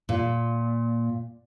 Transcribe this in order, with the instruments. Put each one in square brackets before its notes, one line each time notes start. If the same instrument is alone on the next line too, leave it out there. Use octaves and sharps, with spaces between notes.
[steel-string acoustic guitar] A#2